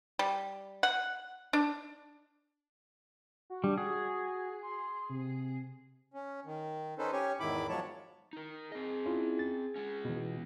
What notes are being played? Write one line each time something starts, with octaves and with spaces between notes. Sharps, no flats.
G3
F#5
D4
F#4
G3 D4
F#4 G#4
C6
C3
C#4
D#3
C#4 D#4 A4 B4 C5
C#4 G4 C#5 G#5
E2 G#2 D#3 E4 B5 D6
F3 F#3 G#3 C#5 A5
D#4 A#4
C4 G#4 D#5
C#4 E4 F4
A6
G#3 C#4
B2 E3